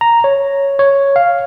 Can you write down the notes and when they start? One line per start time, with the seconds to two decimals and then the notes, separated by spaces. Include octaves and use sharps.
0.01 A#5
0.24 C#5
0.79 C#5
1.16 F5